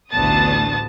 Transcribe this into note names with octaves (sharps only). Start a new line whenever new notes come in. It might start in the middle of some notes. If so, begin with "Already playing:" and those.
A1 D2 B3 A5 D#6 A6